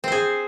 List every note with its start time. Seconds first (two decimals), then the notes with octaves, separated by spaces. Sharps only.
0.04 C4
0.08 C5
0.12 G#4